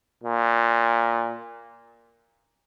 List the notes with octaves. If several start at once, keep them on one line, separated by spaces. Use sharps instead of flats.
A#2